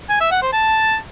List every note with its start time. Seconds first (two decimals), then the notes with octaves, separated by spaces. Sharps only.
0.10 G#5
0.20 E5
0.31 F#5
0.42 C5
0.53 A5